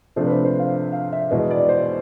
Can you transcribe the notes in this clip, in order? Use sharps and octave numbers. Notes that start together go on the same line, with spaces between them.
C3 F3 A3 D4 C5
B4
C5
C5
F5
F5
E5
E2 B2 G#3 B3 D#5
D5
C5